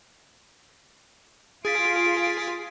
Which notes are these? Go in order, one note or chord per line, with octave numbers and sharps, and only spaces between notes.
F4 G#4 A6 B6 D7